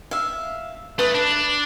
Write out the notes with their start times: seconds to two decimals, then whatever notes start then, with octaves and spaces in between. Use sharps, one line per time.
0.11 E5 F5
0.99 A3 B4 D#6
1.15 D4